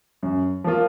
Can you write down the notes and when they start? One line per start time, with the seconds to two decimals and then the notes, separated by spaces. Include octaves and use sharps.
0.23 F#2
0.64 F3 A#3 F4